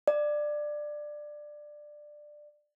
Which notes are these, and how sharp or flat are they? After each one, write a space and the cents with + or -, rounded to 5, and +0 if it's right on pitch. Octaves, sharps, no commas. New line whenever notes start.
D5 +15